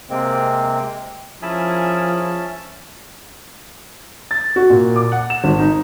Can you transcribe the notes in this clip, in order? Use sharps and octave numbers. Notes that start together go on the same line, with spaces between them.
C3 G#3 A#3 C4
F3 C#4 E4 G#4 A#4 E5 A5
A6
F#4
A#2
D6
F#5
E7
G#1
D#4